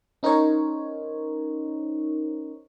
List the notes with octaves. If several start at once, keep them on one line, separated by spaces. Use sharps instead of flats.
C#4 D#4 A#4 C5 C#5